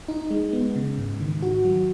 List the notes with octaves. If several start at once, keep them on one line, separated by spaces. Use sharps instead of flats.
D#4
G#3
B3
C#3
G#2
D#3
F#4
F#3